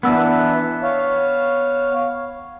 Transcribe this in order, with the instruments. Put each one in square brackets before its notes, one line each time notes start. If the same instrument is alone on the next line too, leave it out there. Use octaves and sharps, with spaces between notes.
[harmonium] E3 D4 [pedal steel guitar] B3 E6
[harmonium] C#5 F5